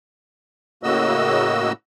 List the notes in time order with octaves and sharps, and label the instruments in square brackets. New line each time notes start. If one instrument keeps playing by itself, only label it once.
[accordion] A2 C#3 A#3 F#4 D#5 E6